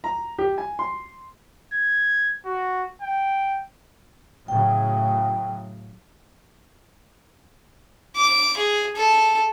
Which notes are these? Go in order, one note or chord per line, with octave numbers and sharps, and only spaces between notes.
A#5
G4
G#5
C6
G#6
F#4
G5
A2 C#3 F#3 G5
D6
G#4
A4